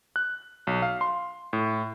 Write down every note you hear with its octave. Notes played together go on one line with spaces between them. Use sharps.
F#6
B1
F5
C6
A2